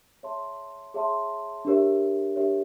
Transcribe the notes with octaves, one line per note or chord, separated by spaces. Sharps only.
G#4 C#5 E5 A5 C6
G#4 C#5 E5 A5 C6
D4 G4 A#4 C#5 E5
D4 G4 A#4 C#5 E5